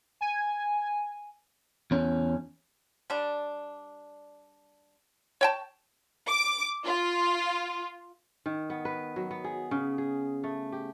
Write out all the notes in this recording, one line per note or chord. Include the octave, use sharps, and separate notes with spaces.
G#5
E2 C#4
G3 D4
C#5 G5 A5
D6
F4
D#3
B3
B4
F#3
B3
G#4
C#3
G#4
A3
G4